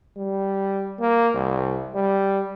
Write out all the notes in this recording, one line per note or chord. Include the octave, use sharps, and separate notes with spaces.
G3
A#3
C2
G3